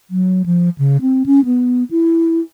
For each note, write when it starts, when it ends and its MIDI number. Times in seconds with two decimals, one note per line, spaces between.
0.10 0.43 54
0.46 0.69 53
0.78 0.97 49
1.01 1.23 60
1.26 1.44 61
1.45 1.84 59
1.91 2.40 64